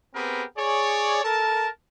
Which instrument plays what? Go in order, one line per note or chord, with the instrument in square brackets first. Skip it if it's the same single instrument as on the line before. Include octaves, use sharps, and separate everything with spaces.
[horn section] B3 C4 G4 G#4 A#4 B4
G#4 C#5 D5
A4 A#4 A5